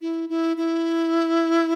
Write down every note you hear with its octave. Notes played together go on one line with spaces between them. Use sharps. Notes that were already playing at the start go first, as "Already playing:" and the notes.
E4
E4
E4